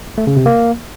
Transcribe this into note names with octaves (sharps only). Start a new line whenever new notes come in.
A3
C#3
C3
A#3